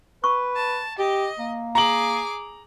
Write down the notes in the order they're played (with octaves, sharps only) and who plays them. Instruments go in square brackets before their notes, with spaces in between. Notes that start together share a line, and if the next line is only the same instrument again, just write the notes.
[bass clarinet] B4 [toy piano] C#6
[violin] A5
[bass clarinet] G4 [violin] D#5
[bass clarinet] A#3
[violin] G#4 D6 [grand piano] A#5 F#7